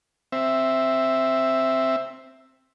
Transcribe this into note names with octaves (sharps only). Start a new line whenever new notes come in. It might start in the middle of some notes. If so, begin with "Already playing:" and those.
C4 E5